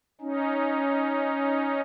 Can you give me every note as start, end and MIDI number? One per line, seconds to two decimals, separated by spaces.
0.21 1.81 61
0.21 1.81 63